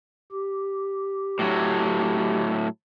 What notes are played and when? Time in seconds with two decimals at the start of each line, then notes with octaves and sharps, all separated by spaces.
0.31 G4
1.39 A2 F#3